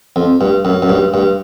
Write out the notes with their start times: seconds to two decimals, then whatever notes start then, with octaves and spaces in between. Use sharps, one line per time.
0.16 F2
0.41 G2
0.65 F#2
0.82 F#2
0.89 G2
1.14 G2